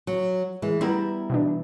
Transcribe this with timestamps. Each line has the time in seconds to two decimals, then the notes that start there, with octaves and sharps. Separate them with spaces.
0.07 F#3
0.62 E3 G#3
0.81 G3 B3 E4 A#5
1.30 B2 E3 D4